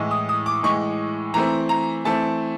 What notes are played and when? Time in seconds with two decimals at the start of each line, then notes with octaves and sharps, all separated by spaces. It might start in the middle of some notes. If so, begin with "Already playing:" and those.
Already playing: A2 E3 G#3
0.11 D#6
0.29 D#6
0.46 D6
0.63 A2 E3 G#3 C#6
1.34 E3 A3 C4 A#5
1.69 A#5
2.04 E3 A3 C4 A5